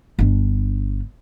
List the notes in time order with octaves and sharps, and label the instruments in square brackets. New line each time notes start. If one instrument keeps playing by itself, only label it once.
[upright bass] G1 D4